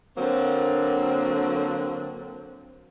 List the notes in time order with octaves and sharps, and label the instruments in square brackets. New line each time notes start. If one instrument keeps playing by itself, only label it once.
[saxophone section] D3 F#3 A#3 C4